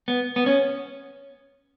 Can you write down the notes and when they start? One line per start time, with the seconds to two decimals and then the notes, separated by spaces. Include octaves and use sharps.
0.08 B3
0.36 B3
0.46 C#4